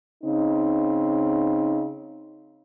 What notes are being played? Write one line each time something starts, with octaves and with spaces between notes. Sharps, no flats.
C#3 C4 D#4